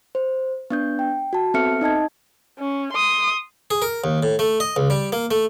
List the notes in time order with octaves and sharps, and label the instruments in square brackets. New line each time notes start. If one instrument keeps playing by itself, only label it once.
[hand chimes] C5
B3 D4 G6
G5
F#4 A5
B3 C4 A4 E5 F6 C#7
D#4 D#5 A5 G#6
[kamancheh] C#4
C6 D#6
[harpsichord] G#4
A#4
D#2
A2
A3
D#5
C#2
G3
A#3
A3